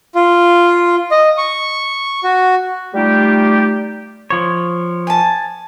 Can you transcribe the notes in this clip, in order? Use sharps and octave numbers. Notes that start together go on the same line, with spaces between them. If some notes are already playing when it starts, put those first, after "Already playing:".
F4
D#5
C#6
F#4
G3 A3 D#4 F4 G4
F3 C#5
G#5 A5